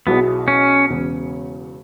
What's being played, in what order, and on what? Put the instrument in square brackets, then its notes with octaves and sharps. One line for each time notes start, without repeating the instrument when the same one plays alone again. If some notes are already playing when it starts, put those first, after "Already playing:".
[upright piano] B1 B2 F#3 E4 G#4 [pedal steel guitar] B3
[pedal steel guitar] C#4
[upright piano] E1 E2 C#3